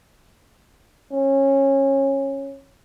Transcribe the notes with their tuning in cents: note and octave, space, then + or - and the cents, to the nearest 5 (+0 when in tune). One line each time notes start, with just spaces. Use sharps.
C#4 -20